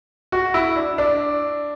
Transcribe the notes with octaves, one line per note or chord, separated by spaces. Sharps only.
F#4
E4
D4
D4